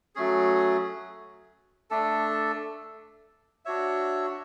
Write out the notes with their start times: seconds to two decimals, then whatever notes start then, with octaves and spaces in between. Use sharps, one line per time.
0.15 F#3 A3 C#4 G#4
1.90 A3 D4 A4
3.65 D4 F#4 C#5 E5